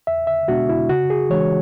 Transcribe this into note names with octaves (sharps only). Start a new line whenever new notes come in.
E2 E5
E5
B2 G#3 B3 D4 F#4
E4
C#3 F#4
G#4
E3 G#3 D4 C#5